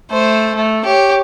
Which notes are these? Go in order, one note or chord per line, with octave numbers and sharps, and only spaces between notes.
A3 C5
A3
G4 C#5